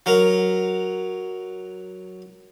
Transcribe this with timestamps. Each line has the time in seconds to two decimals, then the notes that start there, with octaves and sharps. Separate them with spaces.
0.06 F#3 A#4